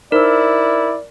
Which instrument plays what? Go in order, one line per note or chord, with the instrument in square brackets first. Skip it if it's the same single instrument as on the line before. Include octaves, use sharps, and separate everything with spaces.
[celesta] D#4 C5 E6 [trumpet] E4 [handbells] A#4 [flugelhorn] D5